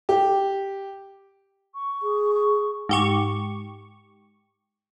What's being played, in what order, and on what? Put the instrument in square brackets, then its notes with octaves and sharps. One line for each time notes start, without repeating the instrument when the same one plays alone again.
[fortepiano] G4
[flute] C#6
[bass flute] G#4
[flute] C#6
[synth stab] G#2 G4 C#6